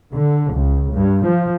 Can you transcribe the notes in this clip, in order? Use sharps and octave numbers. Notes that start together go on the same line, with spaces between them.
D3
C#2
G2
F3